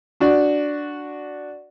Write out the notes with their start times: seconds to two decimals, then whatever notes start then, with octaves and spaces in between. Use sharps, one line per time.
0.20 D4 F#4 D5